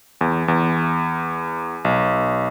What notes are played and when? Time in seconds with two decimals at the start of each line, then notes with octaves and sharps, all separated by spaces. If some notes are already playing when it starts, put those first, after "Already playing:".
0.21 E2
0.48 E2
1.85 B1